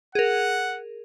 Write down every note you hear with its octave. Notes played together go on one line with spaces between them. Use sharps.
G#4 A#4 F#5